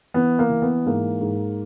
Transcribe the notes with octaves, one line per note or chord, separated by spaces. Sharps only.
E3 B3
A#3
E3
B3
G#2 A#3
G#2